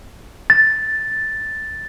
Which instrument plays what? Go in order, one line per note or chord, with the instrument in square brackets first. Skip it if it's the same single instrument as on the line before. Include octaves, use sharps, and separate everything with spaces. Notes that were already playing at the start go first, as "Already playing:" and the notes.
[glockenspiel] A6